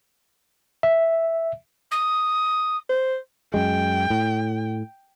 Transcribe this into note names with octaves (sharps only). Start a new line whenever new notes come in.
E5
D#6
C5
F#2 G#3 G5
A2